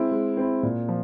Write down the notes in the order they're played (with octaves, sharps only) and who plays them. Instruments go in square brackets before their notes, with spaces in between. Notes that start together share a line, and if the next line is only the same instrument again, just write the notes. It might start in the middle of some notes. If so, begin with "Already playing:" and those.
Already playing: [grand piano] G#3 C4 E4
G#3
C4 E4
A#2
F3